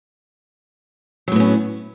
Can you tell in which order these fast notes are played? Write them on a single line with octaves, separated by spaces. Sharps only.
F#3 A2 B3 C#4